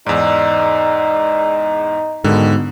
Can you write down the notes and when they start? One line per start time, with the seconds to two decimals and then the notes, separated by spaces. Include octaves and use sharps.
0.06 E2 G#2 D#4 D5 E6
2.24 G#2 D3 D#3 B3 D#4 F#4